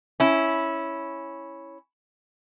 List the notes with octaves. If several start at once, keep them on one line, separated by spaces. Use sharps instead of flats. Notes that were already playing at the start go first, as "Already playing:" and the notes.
C#4 E4